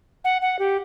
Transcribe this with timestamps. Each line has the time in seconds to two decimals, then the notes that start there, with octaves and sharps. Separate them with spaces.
0.24 F#5
0.42 F#5
0.59 G4